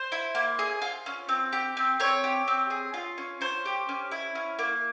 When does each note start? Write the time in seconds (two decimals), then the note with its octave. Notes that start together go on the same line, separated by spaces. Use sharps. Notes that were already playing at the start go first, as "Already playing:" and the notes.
Already playing: C5
0.12 E4
0.35 A#3
0.59 G#4
0.82 F4
1.06 C#4
1.29 C4
1.53 G4
1.77 C4
2.00 C4 C#5
2.24 G4
2.48 C4
2.70 G#4
2.94 F4
3.18 C#4
3.41 C#4 C5
3.65 G4
3.89 C#4
4.11 E4
4.35 C#4
4.59 A#3